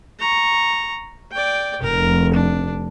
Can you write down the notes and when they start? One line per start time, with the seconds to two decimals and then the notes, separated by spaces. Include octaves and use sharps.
0.20 A#5 C#6
1.32 D5 G5
1.82 F1 A#4
2.33 D4